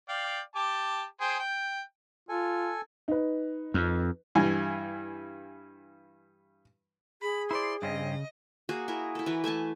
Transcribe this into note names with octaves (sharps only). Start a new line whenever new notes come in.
D5 F5 G5
G4 A5 D6
G#4 C5 G5
G5
F4 A4 G#5
D#4 B4
F2
G2 E3 G#5
G#4 B5
E4 C5 D5 C6
G2 C#3 C4 C#4 D#5
A#3 F#4 G#4
E4 G#4 A#4
E4 A4
E3 A#4 B4
A3 E5 G#5 A5